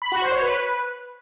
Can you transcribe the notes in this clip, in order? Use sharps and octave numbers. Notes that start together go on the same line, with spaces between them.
B5
F#4
C5
C#5
B4